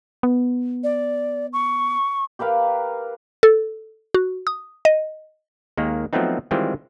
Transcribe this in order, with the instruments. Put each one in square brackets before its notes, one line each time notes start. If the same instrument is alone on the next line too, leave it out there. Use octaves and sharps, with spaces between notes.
[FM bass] B3
[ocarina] D5
C#6
[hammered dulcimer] G4 A#4 B4 F5
[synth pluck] A4
F#4
D#6
D#5
[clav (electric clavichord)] D#2 D#3 G#3 A#3
F3 F#3 A3 B3 C4 D#4
D#3 E3 G3 G#3 C4 F4